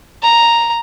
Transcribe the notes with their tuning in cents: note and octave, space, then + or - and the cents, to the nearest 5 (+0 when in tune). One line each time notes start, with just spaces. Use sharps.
A#5 +0